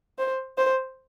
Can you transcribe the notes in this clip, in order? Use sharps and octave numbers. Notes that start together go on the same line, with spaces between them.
C5
C5